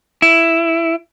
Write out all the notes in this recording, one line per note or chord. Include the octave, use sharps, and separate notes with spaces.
E4